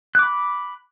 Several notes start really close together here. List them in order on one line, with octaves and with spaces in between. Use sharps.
F#6 D6 B5